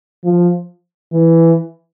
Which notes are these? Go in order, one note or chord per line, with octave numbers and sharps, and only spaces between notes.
F3
E3